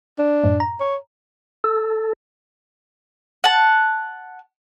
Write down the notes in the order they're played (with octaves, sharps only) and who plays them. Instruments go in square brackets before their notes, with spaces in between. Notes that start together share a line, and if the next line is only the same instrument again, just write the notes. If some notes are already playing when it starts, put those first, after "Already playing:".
[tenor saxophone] D4
[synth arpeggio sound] F#2 A2
A#5
[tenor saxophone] C#5
[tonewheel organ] A4
[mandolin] F#5 A5